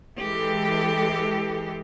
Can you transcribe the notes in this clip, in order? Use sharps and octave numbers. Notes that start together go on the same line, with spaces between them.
E3 G#3 G4 A4